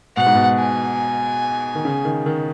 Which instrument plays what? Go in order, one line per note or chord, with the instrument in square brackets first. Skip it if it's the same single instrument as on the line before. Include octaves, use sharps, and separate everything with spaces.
[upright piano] B2 [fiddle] F#5
[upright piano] G#2
B2
[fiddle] G#5
[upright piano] D#3
C#3
D#3
D#3